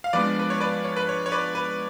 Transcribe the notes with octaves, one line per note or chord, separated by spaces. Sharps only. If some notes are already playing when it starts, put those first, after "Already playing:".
F5
F3 G#3 B3 D4 F4 B4 D5
B4
C#5
B4 D5
C#5
B4
C#5
C#5
B4 D5
B4